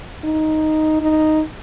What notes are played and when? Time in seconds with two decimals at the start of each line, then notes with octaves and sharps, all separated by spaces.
0.25 D#4
1.01 D#4